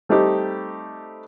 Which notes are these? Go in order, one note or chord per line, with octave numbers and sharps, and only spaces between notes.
G3 A3 C4 D#4 G4